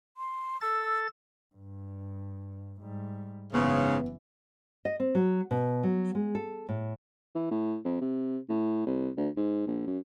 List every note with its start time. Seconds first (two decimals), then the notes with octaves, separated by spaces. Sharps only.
0.17 C6
0.61 A4 E6 A6
1.55 G2
2.81 G#2 G3
3.53 F#1 G#2 C#3 E3 B3
4.85 D#5
5.00 C4
5.15 F#3
5.51 B2
5.83 F#3
6.15 G#3
6.35 A4
6.69 A2
7.35 E3
7.51 A2
7.85 F2
8.01 C3
8.49 A2
8.87 C2
9.17 D2
9.37 G#2
9.67 A#1
9.87 F#2